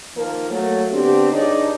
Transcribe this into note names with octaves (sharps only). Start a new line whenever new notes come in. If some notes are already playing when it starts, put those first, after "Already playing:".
D#3 F3 A#3 A#4
F#3 A3 A#3
D3 B3 C4 D4 G4
G2 D4 D#4 G#4 C#5 D5